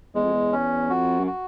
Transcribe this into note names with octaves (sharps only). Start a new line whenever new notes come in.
E2 G#3
F2
E2
C#4
F2 F#4
F#2
F#4